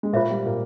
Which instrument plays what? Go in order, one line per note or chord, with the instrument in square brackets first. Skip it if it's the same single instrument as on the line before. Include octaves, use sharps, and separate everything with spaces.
[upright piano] G#3
[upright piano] A#2 A#3 [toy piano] F4 C5 E5
[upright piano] G3
A#2 A#3